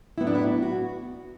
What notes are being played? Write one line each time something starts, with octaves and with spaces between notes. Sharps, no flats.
A2 F#3 B3 E4
D4
E4
F#4